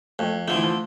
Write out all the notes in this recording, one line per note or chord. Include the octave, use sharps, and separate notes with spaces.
F2 A3
D3 F3 A3
E3
F3